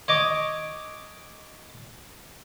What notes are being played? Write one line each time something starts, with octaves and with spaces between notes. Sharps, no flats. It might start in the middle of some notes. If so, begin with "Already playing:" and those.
C#5 D#5 D6